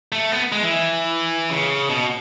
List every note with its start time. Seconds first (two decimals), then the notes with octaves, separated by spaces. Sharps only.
0.12 A3
0.32 B3
0.52 G#3
0.62 E3
1.50 C#3
1.90 B2